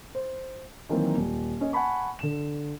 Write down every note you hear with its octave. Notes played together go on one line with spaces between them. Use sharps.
C5
D#3 E3 F#3 A#3 C4
D#1
C#4 D#5
F#5 G#5 A5 B5 C#6
D3 E7